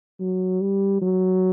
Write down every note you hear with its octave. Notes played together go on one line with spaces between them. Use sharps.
F#3
G3
F#3